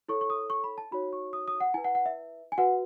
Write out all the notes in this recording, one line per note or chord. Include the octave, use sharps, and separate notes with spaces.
E4 A4 C#5 C#6
C#6
D#6
C#6
B5
A5
D#4 F#4 C#5 B5
C#6
D#6
D#6
F#5
E4 B4 G#5
F#5
F#5
E5
G#5
F#4 B4 F#5